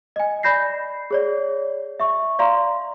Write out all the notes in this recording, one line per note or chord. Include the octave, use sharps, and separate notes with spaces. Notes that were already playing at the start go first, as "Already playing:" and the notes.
D#5 G#5
D5 B5 G6 A#6 C7
G#4 C#5 D5
E5 C#6
D5 F5 A#5 C6